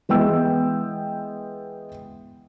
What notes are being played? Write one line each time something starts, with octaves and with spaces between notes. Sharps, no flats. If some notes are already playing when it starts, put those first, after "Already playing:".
E3 G#3 B3 G5 E6